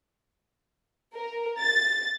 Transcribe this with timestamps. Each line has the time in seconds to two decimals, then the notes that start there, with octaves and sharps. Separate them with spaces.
1.14 A#4
1.59 A6